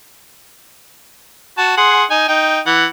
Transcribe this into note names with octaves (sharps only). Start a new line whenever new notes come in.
F#4 A5
G#4 F#5 C6
D#4 G#5
D#4 G5
E3 F#5